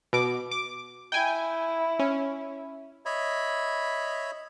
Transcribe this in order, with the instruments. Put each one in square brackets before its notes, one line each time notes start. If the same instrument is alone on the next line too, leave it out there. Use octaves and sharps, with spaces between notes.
[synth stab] B2 D6
D6
[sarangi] E4 [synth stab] G5 G#5
[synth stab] C#4
[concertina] C#5 D#5 E5 B5